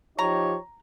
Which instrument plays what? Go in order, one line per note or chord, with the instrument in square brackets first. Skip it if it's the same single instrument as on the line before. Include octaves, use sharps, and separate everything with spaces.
[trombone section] F3 D#4 G4 [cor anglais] C#5 [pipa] A#5